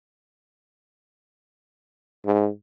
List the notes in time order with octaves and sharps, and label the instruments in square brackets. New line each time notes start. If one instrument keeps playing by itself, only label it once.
[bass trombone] G#2